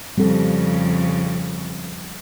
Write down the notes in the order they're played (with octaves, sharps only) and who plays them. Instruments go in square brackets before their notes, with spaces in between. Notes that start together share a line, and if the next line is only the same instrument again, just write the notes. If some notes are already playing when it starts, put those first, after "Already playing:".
[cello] F2 C#3 [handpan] G3 C4 A4